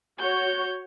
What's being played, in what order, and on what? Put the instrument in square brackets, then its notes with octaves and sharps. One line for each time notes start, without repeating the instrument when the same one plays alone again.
[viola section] F#4 C#5 [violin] G6